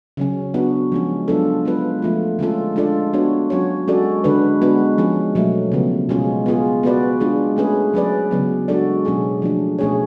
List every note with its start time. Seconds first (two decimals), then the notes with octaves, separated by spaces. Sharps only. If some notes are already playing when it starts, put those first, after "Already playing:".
0.17 C#3 F#3 C#4
0.54 B3 D4 F#4
0.92 F3 G#3 C#4
1.28 F#3 B3 D4 F4 A4
1.65 G#3 B3 F4 B4
2.02 F3 A3 F4
2.39 D3 G#3 C#4 F4 A4
2.76 G#3 D4 F4 A4 D5
3.13 B3 D4 F#4 C#5
3.50 F#3 C#4 F#4 C#5
3.88 G#3 C#4 F#4 A4 D5
4.24 D3 G#3 D4 F#4 B4
4.62 G#3 B3 D4 F#4 B4
4.98 F3 G#3 C#4
5.35 B2 F#3 A3
5.72 C#3 F3 B3
6.09 B2 G#3 C#4 F4 G#4
6.46 B3 F4 G#4
6.83 B3 F#4 B4 D5
7.20 G#3 D4 F4 G#4
7.57 A3 C#4 G#4 B4
7.94 F#3 C#4 G#4 B4 D5
8.31 C#3 F#3 B3
8.68 G#3 D4 F#4 A4 D5
9.05 B2 F#3 C#4 G#4
9.42 F3 A3 D4
9.79 B2 A3 C#4 G#4 C#5